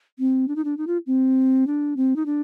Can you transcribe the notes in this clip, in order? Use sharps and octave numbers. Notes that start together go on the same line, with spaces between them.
C4
D4
D#4
D4
D#4
F4
C4
D4
C4
D#4
D4